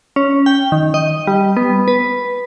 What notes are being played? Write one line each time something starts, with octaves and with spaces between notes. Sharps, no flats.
C#4
G5
D#3
D#5
G3
B3
B4